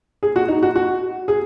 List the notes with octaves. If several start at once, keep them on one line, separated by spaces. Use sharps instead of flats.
G#4
F#4
D#4
F#4
F#4
G#4